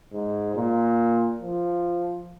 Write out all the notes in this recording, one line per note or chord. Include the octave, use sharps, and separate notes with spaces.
G#2
A#2
F3